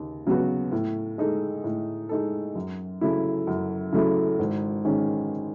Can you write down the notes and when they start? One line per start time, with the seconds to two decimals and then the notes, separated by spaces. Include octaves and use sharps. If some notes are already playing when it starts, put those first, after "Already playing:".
Already playing: D#2 C#3
0.27 C#3 F#3 B3 F#4
0.72 A2
1.18 G#3 D#4 A4
1.64 A2
2.09 G#3 D#4 A4
2.55 F#2
3.01 C#3 F#3 A3 E4
3.47 F#2
3.93 C#3 F#3 A3 E4
4.39 G#1
4.85 D#3 G#3 C#4